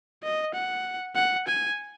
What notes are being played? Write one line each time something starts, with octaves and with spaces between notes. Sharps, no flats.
D#5
F#5
F#5
G#5